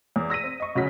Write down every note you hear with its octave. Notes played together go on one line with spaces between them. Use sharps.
E2
E6 A#6 B6 D#7
C4
D#5 C#6
D2 C#3 F#3 F#4 A#6 B6